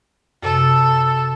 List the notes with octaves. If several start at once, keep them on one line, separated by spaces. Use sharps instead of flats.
F#2 C3 A4